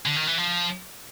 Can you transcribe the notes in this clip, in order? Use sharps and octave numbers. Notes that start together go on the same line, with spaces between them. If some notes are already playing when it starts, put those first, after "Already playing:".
D3
D#3
E3
F3